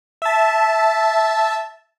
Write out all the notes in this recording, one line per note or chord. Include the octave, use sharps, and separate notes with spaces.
E5 A5